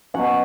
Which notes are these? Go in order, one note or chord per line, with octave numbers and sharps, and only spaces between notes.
B2 F#3 C#4 F#5